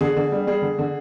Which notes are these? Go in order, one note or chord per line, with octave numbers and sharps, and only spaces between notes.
D3 G#4
D3
G3
G3 G#4
D3
D3